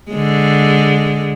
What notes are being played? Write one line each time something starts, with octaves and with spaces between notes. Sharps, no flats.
D3 G#3